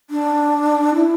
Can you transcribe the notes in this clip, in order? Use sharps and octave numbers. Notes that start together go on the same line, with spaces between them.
D4
E4